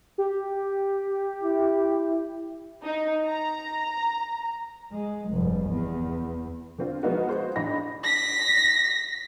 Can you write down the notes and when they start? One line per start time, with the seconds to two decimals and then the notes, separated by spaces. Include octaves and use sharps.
0.18 G4
1.43 E4
2.83 D#4
3.26 A#5
4.92 G#3
5.30 F1 G2
5.68 E2
6.78 D3 C4 F4
7.03 F3 G#3 B3 D#4 F4 F#4
7.29 F#4 G#4 C5
7.56 A1 D4 D#4 B5 A#6
8.04 A#6 B6